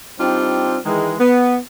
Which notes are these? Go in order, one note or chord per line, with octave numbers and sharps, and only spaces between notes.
G3 C4 D4 D#4 F4
D#3 E3 G#3
B3